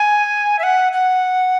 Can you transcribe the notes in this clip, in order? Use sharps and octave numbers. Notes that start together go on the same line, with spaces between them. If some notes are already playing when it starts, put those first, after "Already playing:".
Already playing: G#5
E5
F#5
F#5